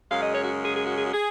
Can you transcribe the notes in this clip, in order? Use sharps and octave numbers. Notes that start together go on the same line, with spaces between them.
F#2 C#3 G#3 F5
D#5
C#5
F#4
G#4
G#4
F#4
G#4
F#4
G#4